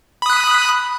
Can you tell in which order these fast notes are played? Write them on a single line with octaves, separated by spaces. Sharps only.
B5 D#6 F#6